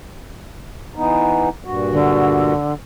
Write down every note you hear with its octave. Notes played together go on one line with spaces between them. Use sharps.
E3 B3 D#4
G2 A#2 F#4
D3